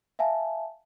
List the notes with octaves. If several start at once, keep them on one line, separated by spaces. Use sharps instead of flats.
E5 F5 G#5 A5